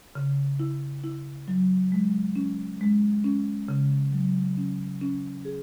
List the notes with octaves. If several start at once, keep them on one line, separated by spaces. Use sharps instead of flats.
C#3
E4
E4
F#3
G#3
C#4
G#3
C#4
C#3
F#3
C#4
C#4
G#4